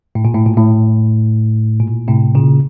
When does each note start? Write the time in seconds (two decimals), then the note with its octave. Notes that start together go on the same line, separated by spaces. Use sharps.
0.15 A2
0.25 A#2
0.34 A2
0.46 A#2
0.57 A2
1.80 A#2
2.08 A2 C3
2.35 A#2 C#3